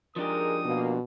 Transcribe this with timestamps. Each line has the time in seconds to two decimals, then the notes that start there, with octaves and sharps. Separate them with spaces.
0.16 F3 G#3 D4 D#4 G4 A#4 D#6
0.65 B2 A#3